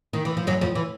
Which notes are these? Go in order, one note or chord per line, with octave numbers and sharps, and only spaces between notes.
D#3
E3
F3
F#2 F#3
F2 F3
E3